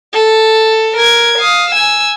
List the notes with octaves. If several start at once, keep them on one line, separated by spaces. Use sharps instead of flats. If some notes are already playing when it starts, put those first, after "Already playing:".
A4
A#4 G#6
F5 D#6
G#5 E6